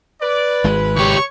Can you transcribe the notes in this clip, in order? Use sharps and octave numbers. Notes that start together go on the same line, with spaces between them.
B4 D5
G#1 G#3
C#2 G4 C#5 C#6